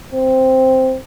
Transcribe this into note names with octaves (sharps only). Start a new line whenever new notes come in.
C4